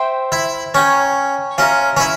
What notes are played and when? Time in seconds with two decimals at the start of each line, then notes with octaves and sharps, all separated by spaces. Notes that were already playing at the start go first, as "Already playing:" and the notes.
Already playing: C5 E5 G5
0.32 E4
0.74 C#4 C#5 G5 A#5
1.58 C#4 F4 A#4 E5 A#5
1.97 C#4
2.00 E4